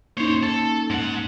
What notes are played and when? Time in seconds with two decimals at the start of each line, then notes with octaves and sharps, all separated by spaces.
0.17 A#3 C#4 D#4 C5 C#5
0.43 A4
0.90 G#2 F#5